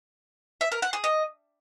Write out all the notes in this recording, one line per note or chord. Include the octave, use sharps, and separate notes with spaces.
E5
A#4
F#5
G#4
D#5